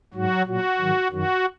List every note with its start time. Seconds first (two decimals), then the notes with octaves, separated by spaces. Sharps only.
0.14 G#2 F#3 F#4
0.46 A#2 F#3 F#4
0.79 G#2 D#3 F#3
1.11 F#2 D#3 F#3 F#4